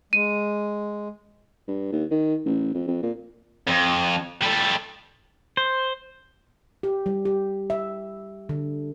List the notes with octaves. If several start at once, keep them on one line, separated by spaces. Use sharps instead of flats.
G#3 D#7
G2
D#2
D#3
A1
F2
F2
A#2
F2
G3 A4
C5
G4
G3
G4
E5
D3